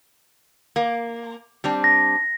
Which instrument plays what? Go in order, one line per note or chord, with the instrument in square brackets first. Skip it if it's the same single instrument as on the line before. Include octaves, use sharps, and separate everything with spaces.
[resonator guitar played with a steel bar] A#3
G3 C4 D4
[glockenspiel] A#6